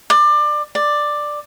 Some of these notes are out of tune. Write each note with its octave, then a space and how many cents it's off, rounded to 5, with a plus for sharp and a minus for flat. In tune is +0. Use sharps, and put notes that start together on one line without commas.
D5 +25
D5 +10